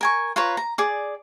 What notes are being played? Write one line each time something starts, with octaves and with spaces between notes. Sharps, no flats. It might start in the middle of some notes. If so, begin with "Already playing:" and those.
A#4 G#5 C#6
F4 B4 C#5 A#5
A#5
G#4 D5